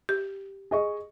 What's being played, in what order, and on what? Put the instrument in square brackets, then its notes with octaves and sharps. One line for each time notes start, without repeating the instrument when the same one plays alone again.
[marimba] G4
[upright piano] G#4 D#5 C#6